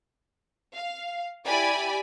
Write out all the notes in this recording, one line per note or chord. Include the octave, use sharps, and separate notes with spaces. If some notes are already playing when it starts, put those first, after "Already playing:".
F5
E4 G4 D5 G#5 B5